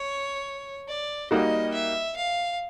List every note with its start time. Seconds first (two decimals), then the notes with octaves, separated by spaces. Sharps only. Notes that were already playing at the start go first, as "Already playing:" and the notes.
Already playing: C#5
0.88 D5
1.31 G3 A#3 D#4 F#4 D#5
1.74 E5
2.17 F5